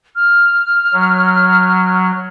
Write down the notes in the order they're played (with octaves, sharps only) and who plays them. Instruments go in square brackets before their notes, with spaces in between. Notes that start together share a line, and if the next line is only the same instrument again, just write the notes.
[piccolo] F6
[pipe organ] F#3